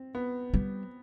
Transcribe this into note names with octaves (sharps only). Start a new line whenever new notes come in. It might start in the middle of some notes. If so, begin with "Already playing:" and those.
Already playing: C4
B3
G3